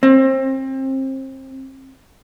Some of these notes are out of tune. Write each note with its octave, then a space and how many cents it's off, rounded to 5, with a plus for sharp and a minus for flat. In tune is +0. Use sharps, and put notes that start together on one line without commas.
C4 +30